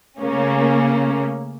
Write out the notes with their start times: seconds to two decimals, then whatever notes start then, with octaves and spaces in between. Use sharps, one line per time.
0.19 C#3 A3 A#3 C#4